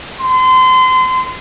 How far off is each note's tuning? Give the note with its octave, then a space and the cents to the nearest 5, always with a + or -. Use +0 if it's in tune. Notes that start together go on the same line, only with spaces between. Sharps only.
C6 -30